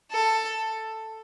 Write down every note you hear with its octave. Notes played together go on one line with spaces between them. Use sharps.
A4